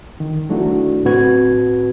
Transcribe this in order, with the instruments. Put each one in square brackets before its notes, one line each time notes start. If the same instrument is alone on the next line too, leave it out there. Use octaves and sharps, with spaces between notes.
[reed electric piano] D#3
F#3 A3 D4 E4 F#4
A2 C4 F#4 B4 G#6